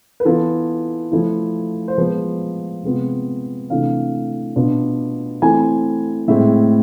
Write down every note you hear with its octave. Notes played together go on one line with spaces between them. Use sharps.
B4
E3 B3 F4 A4
F3 A3 E4
C5
F3 G#3 B3 B4
C3 G#3 B3 F4
C3 E3 A3 D4 F5
B2 B3 D4 F4
E3 A3 C4 E4 G#5
A2 G#3 C4 E5